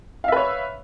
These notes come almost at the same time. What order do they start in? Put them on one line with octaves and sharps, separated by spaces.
F5 E5 B4 C#5